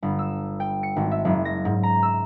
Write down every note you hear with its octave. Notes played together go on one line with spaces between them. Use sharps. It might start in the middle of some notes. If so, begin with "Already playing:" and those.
G1
E6
G5
C#7
G#1
E5
F#1
A#6
G#2
A#5
E6